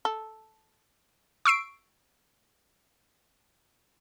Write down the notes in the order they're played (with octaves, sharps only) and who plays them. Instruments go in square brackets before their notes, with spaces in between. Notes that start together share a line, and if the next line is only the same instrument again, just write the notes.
[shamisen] A4
[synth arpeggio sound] C#6 E6 C7 D7